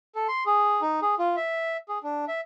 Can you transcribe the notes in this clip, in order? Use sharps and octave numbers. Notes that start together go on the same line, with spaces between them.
A4
C6
G#4
D#4
G#4
F4
E5
G#4
D4
E5